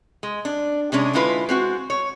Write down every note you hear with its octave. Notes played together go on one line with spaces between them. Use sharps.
G#3
D4
C3 G#3 C#4 D4
D3 G#3 E4 F4 B4
G#3 C4 F#4
C#5